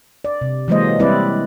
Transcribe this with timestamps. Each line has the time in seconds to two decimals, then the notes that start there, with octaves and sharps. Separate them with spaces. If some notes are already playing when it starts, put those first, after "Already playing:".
0.25 D5
0.41 C3
0.68 E3 F#3 G#3 A#3 C5 D#5
0.99 G3 C4 E4 B4 D5